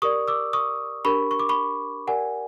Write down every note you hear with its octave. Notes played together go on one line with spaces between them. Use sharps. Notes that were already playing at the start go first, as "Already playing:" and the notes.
G4 A#4 D5 C#6 D#6
D6 E6
C#6 D#6
D4 G4 A#4 B5 C#6
C#6
D6
B5 C#6
G4 A#4 D5 F#5 G#5